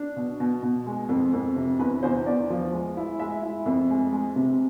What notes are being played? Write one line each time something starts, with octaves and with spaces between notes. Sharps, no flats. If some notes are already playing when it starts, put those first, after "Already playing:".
Already playing: D4
B2
B2
B2
G#3
F2
F2
C3
E2 B4
E2 C5
E2 D5
F3
G#3
E4
G#3 E5
E4
F2
G#3
G#3
C3